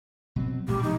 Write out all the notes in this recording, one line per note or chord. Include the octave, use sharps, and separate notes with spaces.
B2 F#3 C4
A1 A#2 G#3 G4
B2 F3 G#3 D#4